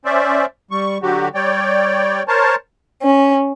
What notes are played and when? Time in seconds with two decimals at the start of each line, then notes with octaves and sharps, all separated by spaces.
0.05 C#4 C5 D5 E5
0.71 G3 C#6
1.02 D3 F#3 F#4 G4
1.35 G3 C#5 D5 G5
2.28 A#4 C5 C#5 A5
3.03 C#4